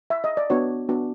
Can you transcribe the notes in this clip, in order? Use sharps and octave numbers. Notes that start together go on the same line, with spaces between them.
E5
D#5
D5
B3 D4 F#4 C#5
B3 D4 F#4